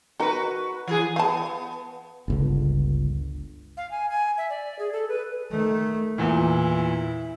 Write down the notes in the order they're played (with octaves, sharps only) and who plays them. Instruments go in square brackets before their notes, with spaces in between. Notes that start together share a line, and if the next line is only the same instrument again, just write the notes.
[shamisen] D#4 A#4 [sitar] F#4 B4
[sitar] E3 G#4
[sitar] B3 [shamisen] F5 A5
[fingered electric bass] G1 C#2 D3
[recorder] F5
G#5
G#5
E5
D5
G#4
A4
B4
[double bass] D#3 A3
[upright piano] E2 A#2 [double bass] E4